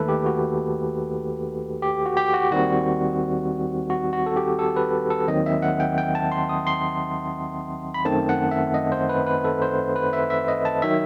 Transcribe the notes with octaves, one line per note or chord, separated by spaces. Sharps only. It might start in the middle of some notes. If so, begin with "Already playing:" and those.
Already playing: D#2 D#3 A3 A4 B4
G4
F#4
G4
F#4
G4
F#4
D#2 D#3 G3 C4 F#4
F#4
F#4
A4
G4
A4
B4
A4
D#2 D#3 F#3 C4 D#5
E5
F#5
G5
G5
A5
C6
D#6
C6
B5
F#2 D#3 A3 C4 A5
F#5
E5
D#5
C5
B4
B4
A4
C5
B4
E5
E5
D#5
A5
D#3 F#3 E5